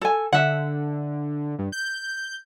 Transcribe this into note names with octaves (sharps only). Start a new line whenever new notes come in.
A4 G#5
D3 E5 F#5
G2
G6